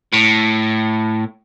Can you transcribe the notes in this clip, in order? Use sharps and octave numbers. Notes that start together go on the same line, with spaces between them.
A2